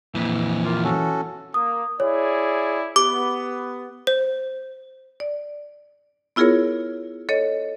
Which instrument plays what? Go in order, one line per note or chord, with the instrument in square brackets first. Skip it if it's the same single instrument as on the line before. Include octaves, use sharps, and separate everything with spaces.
[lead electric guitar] F2 A#2 [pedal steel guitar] E3
[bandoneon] A#3 F4
C#4 F#4 A4
[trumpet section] A#3 [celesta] D#6
[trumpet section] E4 G#4 D5 [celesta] C#5
[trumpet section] B3 [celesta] G4 [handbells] D6
[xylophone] C5
[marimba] D5
B3 E4 F4 G#4 A#4 C#5
A4 C#5 D#5